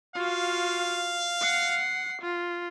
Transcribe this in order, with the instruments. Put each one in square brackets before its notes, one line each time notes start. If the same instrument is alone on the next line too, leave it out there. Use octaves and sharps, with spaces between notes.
[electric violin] F4 F#4 [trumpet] F5
[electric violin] F#5 C7
F4